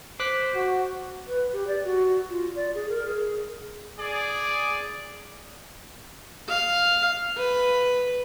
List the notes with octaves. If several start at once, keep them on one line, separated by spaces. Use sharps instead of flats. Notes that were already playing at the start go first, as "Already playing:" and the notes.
C5 D6 F#6 B6
F#4
B4
G4
D5
F#4
F4
D5
G#4
A#4
G#4
G#4 D5
F5
B4